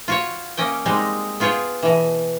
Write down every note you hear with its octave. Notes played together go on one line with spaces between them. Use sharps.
F4 F#4 C#5
A#3 C#4 D#5 G5
G3 G#3 C4 D#4
B3 F4 G#4 C#5 G5
B2 E3